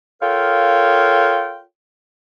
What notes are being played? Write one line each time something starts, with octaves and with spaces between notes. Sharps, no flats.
F4 A4 A#4 C#5 F5 G5